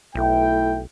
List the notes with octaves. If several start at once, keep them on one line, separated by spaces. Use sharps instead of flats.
B1 A3 E4 G5